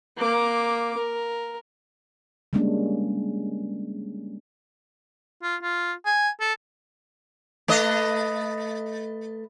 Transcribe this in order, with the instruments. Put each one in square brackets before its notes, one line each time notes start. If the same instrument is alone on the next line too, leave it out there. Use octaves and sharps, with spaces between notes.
[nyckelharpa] A#3 D6
A#4
[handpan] G3 G#3 A#3 C#4 D4
[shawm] F4
F4
G#5
A4
[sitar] A3 B4 D#5